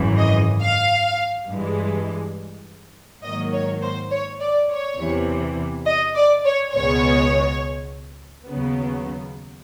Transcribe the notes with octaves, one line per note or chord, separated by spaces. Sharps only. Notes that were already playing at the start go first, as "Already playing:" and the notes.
Already playing: G#1 F#2 C#3 E3
D#5
F5
G2 E3 G#3
G#2 D#3 F#3 A#3 D#5
C#5
C5
C#5
D5
C#5
E2 C3 E3
D#5
D5
C#5
C#2 B2 G#3 B3 C#5
D#2 C#3 F#3 B3